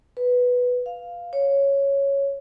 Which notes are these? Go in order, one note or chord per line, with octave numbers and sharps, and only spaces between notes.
B4
F5
C#5